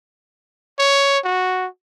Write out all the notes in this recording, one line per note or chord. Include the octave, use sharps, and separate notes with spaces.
C#5
F#4